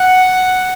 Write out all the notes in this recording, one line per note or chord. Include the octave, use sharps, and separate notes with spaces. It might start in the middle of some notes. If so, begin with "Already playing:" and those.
Already playing: F#5